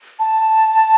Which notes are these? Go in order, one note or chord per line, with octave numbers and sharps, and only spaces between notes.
A5